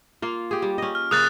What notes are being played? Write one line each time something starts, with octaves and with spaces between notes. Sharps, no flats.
A#3 F4
G4 G#4
G3
C#4 D#5
F6
C#3 A#3 D#6 F#6 A6